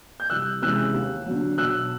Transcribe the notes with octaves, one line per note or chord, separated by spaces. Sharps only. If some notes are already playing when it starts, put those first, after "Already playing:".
G6
C2 E6 F#6
C3 E3 G#3 C#4 E6 F#6
D#2
D3 F#3
B1 E6 F#6